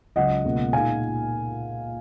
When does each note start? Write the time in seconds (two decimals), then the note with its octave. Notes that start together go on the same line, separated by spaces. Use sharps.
0.16 C#2 C#3 F#3 C#4 D#5 F#5
0.45 C#2 B2 A#3
0.73 A#2 G#3 D#4 F5 G#5